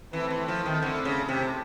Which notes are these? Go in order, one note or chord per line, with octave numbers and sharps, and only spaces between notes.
E3 A3 C4 E4 A4
E3
F3
D#3
D3
C#3
C3